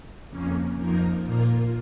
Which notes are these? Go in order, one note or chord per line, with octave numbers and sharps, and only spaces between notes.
F2 C#3 A#3 C#4
F2 F3 A#3 D#4 A#4
A#2 A#3 F4 A#4